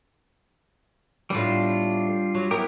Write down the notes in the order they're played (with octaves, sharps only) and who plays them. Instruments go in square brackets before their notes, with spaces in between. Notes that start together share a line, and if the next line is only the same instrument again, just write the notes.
[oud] A2 B3 [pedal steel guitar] G3 D4 F4
[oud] F#3
[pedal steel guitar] B3 E4 G4 [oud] A#4